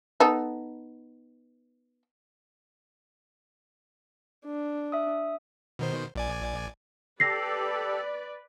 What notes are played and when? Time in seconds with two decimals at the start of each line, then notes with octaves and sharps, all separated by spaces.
0.20 B3 D#4 A4
4.45 D4
4.92 E5 D#6
5.79 B2 D#3 C5
6.15 A#1 D5 G#5
7.20 G4 A4 B4 D5 A#6 C7